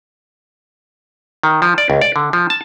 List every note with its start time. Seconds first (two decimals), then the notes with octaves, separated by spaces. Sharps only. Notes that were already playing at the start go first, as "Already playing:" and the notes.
1.43 D#3
1.62 F3
1.78 D5
1.90 C#2
2.01 D5
2.16 D3
2.33 F3
2.50 A5